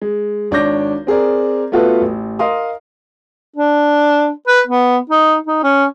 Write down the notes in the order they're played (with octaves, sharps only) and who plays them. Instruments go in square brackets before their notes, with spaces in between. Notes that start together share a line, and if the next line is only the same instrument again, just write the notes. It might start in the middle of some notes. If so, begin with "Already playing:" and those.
[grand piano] G#3
G#1 D4 C#5 D6 G6 A#6
C4 G#4 A#4 D5
A3 B3 F4 F#4 A4 B4
A1
A#4 D#5 F5 C6 D#6
[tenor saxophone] D4
B4
B3
D#4
D#4
C#4